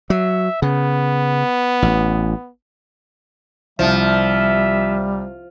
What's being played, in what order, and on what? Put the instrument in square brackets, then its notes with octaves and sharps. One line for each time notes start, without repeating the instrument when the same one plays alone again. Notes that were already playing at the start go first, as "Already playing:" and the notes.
[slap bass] F#3 [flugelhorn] E5
[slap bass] C#3 [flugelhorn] B3
[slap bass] A1
[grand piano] C2 [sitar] F3 [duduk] G3 [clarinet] E5